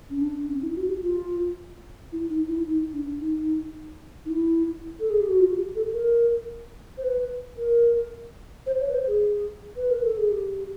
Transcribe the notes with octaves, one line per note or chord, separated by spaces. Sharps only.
C#4
D4
C#4
E4
F#4
G4
F4
E4
D#4
E4
D#4
D4
D#4
D#4
E4
A4
G#4
G4
F#4
F4
G4
A4
A#4
C5
B4
A#4
C5
C#5
B4
C5
G#4
B4
A#4
A4
G#4
G4